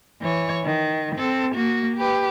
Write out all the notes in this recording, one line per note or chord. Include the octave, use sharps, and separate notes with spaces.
E3 C#5
D#3
C4 A4
A#3 F#4
G4 B4